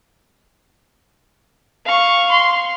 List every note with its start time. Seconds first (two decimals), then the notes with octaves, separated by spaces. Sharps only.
1.86 F5 C#6
2.31 C6